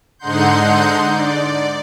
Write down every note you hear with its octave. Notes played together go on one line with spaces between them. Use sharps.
G#2 D3 D#4 F#5 C6 G6
D5